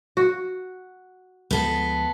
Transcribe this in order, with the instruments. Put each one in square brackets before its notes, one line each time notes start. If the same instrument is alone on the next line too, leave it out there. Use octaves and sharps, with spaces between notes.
[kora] F#4
[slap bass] D2 F3 G#3 [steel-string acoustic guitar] B3 A4